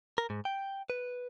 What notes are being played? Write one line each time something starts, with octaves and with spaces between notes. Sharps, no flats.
A#4
G#2
G5
B4